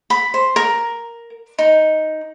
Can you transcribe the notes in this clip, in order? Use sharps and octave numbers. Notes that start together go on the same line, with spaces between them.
B5
C5
A#4
D#4